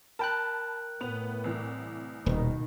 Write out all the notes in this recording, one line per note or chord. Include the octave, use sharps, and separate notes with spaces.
A#4 G5 A5 B5 F#6
A2 B3 B4 F7
C2 E3
D#1 B2 D#3